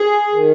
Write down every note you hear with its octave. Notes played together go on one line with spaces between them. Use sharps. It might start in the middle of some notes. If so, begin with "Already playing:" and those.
Already playing: G#4
D#3